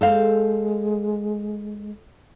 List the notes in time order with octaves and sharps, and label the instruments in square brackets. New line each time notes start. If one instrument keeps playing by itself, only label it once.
[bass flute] G#3 [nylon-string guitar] A4 C5 F5